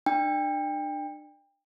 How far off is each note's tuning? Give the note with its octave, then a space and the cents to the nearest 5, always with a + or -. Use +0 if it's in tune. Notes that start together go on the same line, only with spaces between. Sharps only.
D4 +35 G5 +30